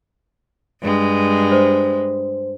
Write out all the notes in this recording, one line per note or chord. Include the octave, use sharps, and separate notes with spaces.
G2 G#3
C5